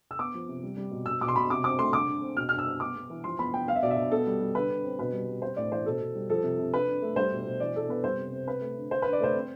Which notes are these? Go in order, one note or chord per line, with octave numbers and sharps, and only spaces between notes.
E6
B3 D6
F3
C3
G3
G3
B2
B2 E6
B2 D6
C6
B2 B5
C3 D6
C4 D6
A3 C6
D3 D6
D3
C4
B2 F6
D4 F6
E6
B3
B3 D6
B3
E3
F3 C6
B3 B5
B3 G5
B3 F5
E5
B2 D5
E5
B2
B3 A4
G3
G3
D3 B4
D3
C4
B2 B4
G3
G3
C4 C5
A2 D5
E3 C5
B2 A4
B2
G3
F3 A4
C3
C3
D4 B4
D4
A3
G3 C5
B2
B2
E3 D5
E3 A4
B3 B4
G3 C5
C3
C3
C4 B4
A3
D3
D3 C5
D3 B4
D5
A3 C5
C4